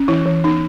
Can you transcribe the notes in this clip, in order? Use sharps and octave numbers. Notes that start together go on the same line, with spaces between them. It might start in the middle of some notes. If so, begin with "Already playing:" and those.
Already playing: C#4
E3 E4
E3
B3 D#4